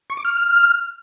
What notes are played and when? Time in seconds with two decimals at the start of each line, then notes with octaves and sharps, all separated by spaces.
0.10 C#6
0.17 D6
0.25 F6